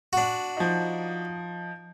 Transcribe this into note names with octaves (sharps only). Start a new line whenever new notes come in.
D4 F#4
F3 D#4